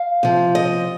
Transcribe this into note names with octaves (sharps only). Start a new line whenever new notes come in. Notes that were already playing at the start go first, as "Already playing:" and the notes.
Already playing: F5
C3 F3
D#5